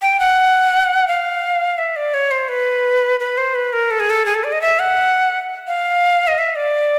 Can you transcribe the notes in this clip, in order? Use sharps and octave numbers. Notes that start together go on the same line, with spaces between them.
G5
F#5
F5
E5
D5
C#5
C5
B4
B4
C5
B4
A#4
A4
G#4
A4
G#4
A4
D5
D#5
E5
F#5
F5
D#5
E5
D5